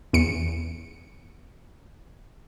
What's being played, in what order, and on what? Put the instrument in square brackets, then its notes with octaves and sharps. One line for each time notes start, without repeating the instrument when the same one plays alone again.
[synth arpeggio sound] E2 C#7